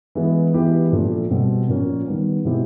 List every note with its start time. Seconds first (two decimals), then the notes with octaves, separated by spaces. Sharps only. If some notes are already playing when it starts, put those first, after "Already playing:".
0.15 E3 G#3 B3 E4
0.54 E3 G#3 B3 E4 G4
0.92 A#2 F3 A3 D4
1.30 B2 G3 C4
1.69 A#2 F3 A#3 C#4
2.07 D#3 G3 B3
2.45 B2 G#3 C4 E4 G4